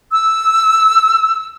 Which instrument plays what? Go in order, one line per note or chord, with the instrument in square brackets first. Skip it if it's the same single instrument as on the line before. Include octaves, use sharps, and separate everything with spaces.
[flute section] E6